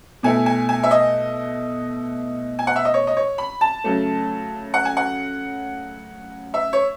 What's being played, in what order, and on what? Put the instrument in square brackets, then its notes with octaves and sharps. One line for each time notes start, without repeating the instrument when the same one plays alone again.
[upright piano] B2 A3 E4 G#5
G#5
G#5
E5
D#5
G#5
F#5
E5
D#5
C#5
D#5
C#5
B5
A5
C#3 F#3 A3
F#5
G#5
F#5
E5
C#5